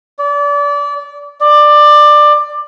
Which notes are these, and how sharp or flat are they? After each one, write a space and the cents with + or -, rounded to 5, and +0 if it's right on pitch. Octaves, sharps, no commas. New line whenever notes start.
D5 -30
D5 +20